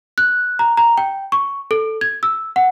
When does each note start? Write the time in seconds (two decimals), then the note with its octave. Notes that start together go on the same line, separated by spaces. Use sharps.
0.18 F#6
0.59 A#5
0.77 A#5
0.98 G5
1.32 C#6
1.71 A4
2.01 G#6
2.23 E6
2.56 F#5